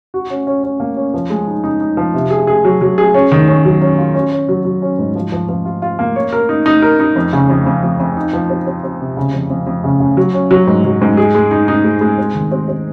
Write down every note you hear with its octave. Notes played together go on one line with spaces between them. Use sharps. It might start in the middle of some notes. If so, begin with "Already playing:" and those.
F#4
C#4
C#4
C#4
A#3
C#4
F3
G#3
D#4
D#4
D#4
F3
C3
G#4
G#4
F#3
F#3
G#4
C#4
D#3
C#4
F#3
C#4
F4
C#4
C#4
F#3
F#3
C#4
G#2
F3
F3
F3
F4
F4
A#3
C#5
A#4
D#4
D#4
A#4
D#4
F2
C#3
F2
F2
F2
F2
D#4
F3
C4
C4
C4
C3
C#3
F2
F2
F2
C#3
C#3
F#3
C#4
F#3
G#2
F#3
G#2
G#4
G#3
D#4
D#4
G#3
G#3
C4
D#3
C4
C4